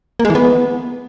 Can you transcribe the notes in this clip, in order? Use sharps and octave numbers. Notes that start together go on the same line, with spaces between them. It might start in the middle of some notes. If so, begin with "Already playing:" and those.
A#3
G#3
E3
B3